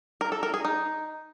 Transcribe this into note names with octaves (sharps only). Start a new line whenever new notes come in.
A#4
A4
A#4
G#4
D#4